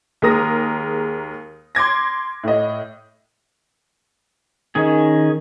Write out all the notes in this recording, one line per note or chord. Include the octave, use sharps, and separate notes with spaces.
D#2 G#3 A#4 D#6 A#6
C6 D6 G#6 A#6
A2 D#5
D#3 C#4 G#4